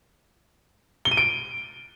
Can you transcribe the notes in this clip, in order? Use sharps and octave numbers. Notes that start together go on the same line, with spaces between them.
G7
D#7
D7